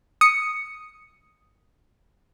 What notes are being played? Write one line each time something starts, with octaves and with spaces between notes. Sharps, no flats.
D#6 C#7